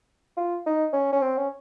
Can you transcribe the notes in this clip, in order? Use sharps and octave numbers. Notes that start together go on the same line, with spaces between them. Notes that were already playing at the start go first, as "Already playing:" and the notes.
F4
D#4
C#4
C#4
C4
C#4